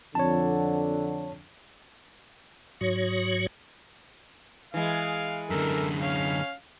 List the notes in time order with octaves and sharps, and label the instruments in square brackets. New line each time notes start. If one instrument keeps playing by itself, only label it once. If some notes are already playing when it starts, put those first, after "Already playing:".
[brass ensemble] F2 D3 [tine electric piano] C#5 A5
[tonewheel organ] G#2 F#3 F#4 C#5
[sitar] E3 G#3 [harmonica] F5
[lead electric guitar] F#2 D3 [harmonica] A4 A#4
[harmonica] C#4 F5